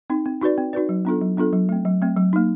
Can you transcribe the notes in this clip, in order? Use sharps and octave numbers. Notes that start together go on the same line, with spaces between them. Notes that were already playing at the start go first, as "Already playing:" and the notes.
C4 D#4
C4
D#4 F#4 B4 D5
C4
D#4 F#4 B4 D5
F#3
B3 D4 F4 A4
F#3
B3 D4 F4 A4
F#3
A3 C4
F#3
A3 C4
F#3
A#3 D#4